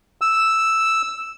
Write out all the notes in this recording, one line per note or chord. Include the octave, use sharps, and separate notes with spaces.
E6